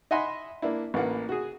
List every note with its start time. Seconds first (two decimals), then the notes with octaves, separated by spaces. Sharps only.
0.11 D#5 E5 F#5 G#5 B5 C6
0.62 A#3 D4 E4
0.94 A1 E3 A#3 F#5
1.29 F#4 G#4